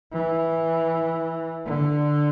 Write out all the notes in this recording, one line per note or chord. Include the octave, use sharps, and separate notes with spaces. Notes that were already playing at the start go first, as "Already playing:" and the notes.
E3
D3